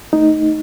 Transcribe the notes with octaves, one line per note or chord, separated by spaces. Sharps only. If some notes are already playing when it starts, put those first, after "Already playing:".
A3 D#4